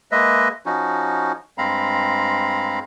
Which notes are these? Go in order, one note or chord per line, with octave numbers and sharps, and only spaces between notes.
G#3 A#3 B4 D#5 E5
F3 C#4 D#4 F#4
G2 G#3 C4 F5 A#5 B5